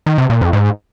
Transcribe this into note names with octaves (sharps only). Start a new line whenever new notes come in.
D#3
C3
A#2
F2
G#2